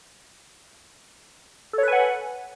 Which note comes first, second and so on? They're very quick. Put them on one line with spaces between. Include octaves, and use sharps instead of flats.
A4 C#5 B4 G#5 F#5